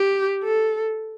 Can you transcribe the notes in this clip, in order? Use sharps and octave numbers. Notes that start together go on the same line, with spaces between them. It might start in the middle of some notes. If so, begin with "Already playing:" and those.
Already playing: G4
A4